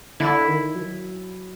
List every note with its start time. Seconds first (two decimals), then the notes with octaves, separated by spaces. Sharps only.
0.20 D3 E4
0.48 D#3
0.75 F#3